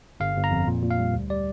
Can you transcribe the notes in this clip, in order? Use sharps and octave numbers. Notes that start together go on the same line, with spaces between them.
G1 F5
G1
A#5
F2
A#2
A#2
F5
G3
D2
G3 D5